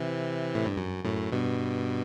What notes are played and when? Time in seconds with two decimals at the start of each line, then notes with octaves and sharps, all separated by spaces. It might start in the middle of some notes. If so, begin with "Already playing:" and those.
Already playing: C3 E3
0.55 A2
0.66 G2
0.77 F#2
1.05 F#2 A2
1.32 G2 B2